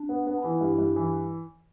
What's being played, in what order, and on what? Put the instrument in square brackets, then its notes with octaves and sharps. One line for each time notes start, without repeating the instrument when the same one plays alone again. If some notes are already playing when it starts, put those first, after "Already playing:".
Already playing: [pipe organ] D4
[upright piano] B3
B3
[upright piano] E3 [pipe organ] E4
[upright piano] G2
G2
E3